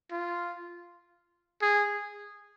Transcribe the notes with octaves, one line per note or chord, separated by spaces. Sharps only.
F4
G#4